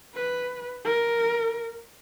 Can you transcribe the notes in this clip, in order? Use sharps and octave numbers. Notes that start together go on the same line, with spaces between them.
B4
A#4